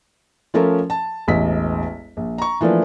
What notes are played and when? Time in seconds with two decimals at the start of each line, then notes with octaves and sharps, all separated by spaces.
0.54 F3 A3 C#4 F4 A4 A#4
0.90 A5
1.28 E1 A1 D#5 B6
2.17 A#1
2.38 A#5 C#6
2.61 E3 F3 A3 A#3 D4